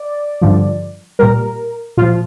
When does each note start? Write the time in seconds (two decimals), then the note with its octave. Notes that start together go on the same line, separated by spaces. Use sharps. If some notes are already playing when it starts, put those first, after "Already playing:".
Already playing: D5
0.41 G2 D3 F3
1.19 A#2 G3 A#4
1.97 A#2 F3 F4